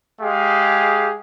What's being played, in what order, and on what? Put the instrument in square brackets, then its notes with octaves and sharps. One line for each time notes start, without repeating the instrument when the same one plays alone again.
[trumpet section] G#3 G4 G#4 F5